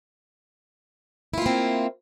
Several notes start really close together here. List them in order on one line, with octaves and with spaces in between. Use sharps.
E4 F4 A#3 C4